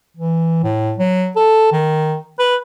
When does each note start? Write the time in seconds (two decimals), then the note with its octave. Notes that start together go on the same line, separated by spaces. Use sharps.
0.17 E3
0.63 A2
0.98 F#3
1.36 A4
1.72 D#3
2.39 B4